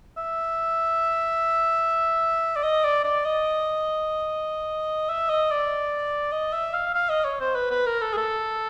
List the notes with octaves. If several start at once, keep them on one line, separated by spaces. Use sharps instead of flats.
E5
D5
D#5
D5
D5
D#5
E5
D#5
D5
D#5
E5
F5
F5
D#5
C#5
C5
B4
B4
A#4
A4
G#4
A4